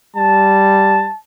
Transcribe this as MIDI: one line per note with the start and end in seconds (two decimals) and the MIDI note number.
0.16 1.09 55
0.16 1.17 81